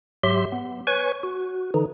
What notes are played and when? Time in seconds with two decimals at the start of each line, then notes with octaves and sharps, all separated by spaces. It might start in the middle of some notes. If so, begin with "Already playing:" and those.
0.23 G#2 F#3 G4 E5 C6
0.52 B3
0.87 B4 C#5 G#5 C#6
1.23 F#4
1.74 D3 E3 D#4